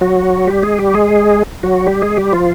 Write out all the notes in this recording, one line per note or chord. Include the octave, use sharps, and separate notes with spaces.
F#3 F#4
G3 G4
G#3 G#4
G3 G4
G#3 G#4
F#3 F#4
G3 G4
G#3 G#4
G3 G4
F3 F4